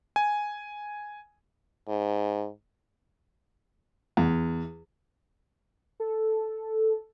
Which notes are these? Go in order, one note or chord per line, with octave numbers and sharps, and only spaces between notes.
G#5
G#2
E2
A4